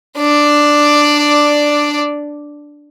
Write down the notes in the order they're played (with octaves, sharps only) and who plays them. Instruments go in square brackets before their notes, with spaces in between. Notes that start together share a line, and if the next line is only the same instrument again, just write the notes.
[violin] D4 D5